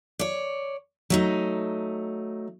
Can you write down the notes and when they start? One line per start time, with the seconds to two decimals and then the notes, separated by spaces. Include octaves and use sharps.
0.19 C#5 D5
1.10 F#3 A3 D#4